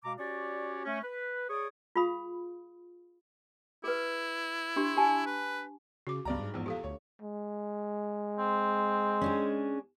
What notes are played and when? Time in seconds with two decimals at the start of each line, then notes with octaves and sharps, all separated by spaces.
0.04 B2 G#3 F5 A#5 D6
0.18 C#4 F#4 G4 C#5 D5
0.85 A3 C#4
1.03 B4
1.50 G#4 C#5 D5 C#6 D#6
1.96 F4 G#4 F5 B5 D#6
3.84 E4 G#4 B4
4.76 D4 G4 C6
4.97 G4 G#5 A5
5.26 B4
6.07 C#3 F#4 D6
6.25 C#2 G2 D5 A#5
6.40 G#2
6.54 A#1 E2
6.66 G4 A4 F5
6.84 D2 C#5
7.22 G#3
8.39 C4
9.21 C#4 D4 G#4